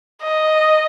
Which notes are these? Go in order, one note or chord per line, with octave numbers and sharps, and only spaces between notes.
D#5